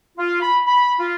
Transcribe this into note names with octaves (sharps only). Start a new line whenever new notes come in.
F4
B5
B5
F4